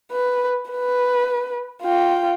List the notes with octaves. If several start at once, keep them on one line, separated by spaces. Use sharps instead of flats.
B4
B4
F4 G5